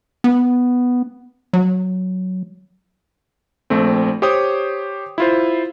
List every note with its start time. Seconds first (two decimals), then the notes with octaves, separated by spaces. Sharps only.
0.24 B3
1.53 F#3
3.70 A#1 A3 C4
4.22 G4 C5 C#5 G5 D#6
5.18 E4 F4 C5